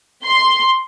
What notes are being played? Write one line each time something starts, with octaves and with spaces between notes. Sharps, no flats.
C6